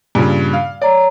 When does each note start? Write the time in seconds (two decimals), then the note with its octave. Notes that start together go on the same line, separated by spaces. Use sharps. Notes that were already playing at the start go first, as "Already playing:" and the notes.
0.15 G2 A#2 C#3
0.53 F5
0.82 C#5 D5 A#5